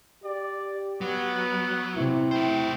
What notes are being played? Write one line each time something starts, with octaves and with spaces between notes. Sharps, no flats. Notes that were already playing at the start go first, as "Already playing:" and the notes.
G4 D5
F#3 B3
C3 E4
A3 C5 G5